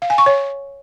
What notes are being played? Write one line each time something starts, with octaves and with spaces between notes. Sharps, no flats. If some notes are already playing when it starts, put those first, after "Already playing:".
F5
G#5
C#6
C#5